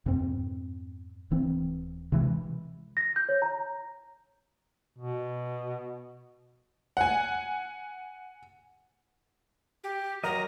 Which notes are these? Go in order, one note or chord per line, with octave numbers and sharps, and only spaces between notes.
F2 G#2 B2 C4
D#1 E3 C4
C3 E3 G#3
A#6
G6
C#5
A#5
B2
F#5 G#5
G4
F#3 A#4 D#5 A#5